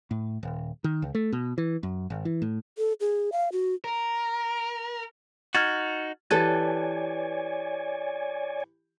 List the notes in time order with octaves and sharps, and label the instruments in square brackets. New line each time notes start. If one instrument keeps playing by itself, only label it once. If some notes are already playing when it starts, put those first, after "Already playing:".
[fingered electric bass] A2
D#1
D#3
C#2
A3
B2
E3
F#2
G#1
E3
A2
[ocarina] A4
G#4
F5
F#4
[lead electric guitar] A#4
[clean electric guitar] D#4 F#4 [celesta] F6 G#6 A6
[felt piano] E3 G4 [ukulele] A4 B4 [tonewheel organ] C#5 D5 G#5